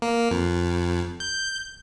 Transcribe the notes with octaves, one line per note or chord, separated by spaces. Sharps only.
A#3
F2
G6